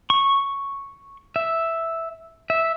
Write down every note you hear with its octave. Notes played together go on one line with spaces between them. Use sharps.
C#6
E5
E5